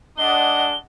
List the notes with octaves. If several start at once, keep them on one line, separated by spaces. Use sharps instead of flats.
G#3 D4 D#5 F#5 G7